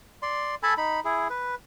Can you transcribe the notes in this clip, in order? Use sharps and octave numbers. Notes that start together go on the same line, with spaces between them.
D5 C6
A4 G#5 A5 B5
D#4 B5
E4 G#4
B4